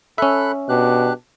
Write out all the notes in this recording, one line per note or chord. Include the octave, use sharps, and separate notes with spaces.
C#4 A4 E5 B5 F#6
B2 D4 G4 F#6